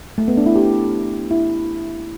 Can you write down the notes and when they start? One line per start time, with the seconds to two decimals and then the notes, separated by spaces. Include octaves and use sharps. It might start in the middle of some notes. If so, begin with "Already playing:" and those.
0.18 A3
0.28 B3
0.37 D4
0.46 E4
0.56 G4
1.31 E4